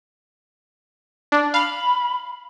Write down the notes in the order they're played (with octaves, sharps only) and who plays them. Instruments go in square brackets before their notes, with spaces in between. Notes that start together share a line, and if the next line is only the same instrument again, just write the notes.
[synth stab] D4
[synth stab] F5 [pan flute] B5